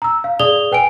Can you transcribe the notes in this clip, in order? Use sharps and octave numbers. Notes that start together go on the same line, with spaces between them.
A#5 E6
F5
G#4 D5 D#6 F7 G7
B4 G5 G#5 D7